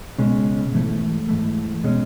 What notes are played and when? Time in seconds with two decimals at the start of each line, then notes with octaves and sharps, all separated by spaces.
0.18 C#2 B2 G#3 C#4
0.73 G#2 E3 A3
1.28 G#2 E3 A3
1.84 B2 G#3 C#4